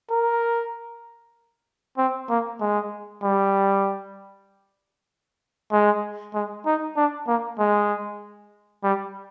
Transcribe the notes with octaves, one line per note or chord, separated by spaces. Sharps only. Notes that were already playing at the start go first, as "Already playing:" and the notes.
A#4
C4
A#3
G#3
G3
G#3
G#3
D#4
D4
A#3
G#3
G3